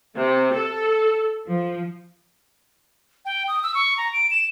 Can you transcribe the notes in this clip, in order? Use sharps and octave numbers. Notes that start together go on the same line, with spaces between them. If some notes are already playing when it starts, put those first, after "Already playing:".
C3
A4
F3
G5
D#6
E6
C#6
A#5
D7
E7